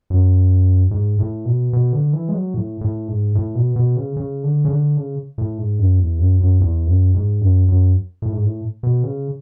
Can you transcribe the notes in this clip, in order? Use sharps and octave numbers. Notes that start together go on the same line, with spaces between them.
F#2
G#2
A2
B2
B2
D3
E3
G#3
F#3
A2
A2
G#2
A2
B2
B2
C#3
C#3
D3
C#3
D3
C#3
A2
G#2
F#2
E2
F#2
F#2
E2
F#2
G#2
F#2
F#2
A2
G#2
A2
B2
C#3